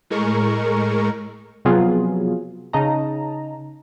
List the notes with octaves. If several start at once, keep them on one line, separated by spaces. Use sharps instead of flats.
A2 G#3 A#4 C#6
C3 F3 F#3 B3 F4 G#4
C#3 D#4 D#5 A5 A#5